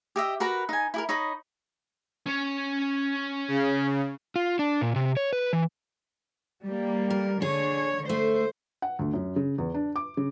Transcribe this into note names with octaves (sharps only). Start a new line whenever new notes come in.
G4 D#5 E5
F#4 A#4 B4 A#5
D#4 G#5
E4 G4 A#4
D#4 C#5 D#5 B5
C#4 C#5
C#3
F4
D4
A#2
C3
C#5
B4
E3
G3 A#3
A#4
D3 G#4 C#5
A3 C5
F#5
D2
F#2
C#3
E2
D4
D6
C#3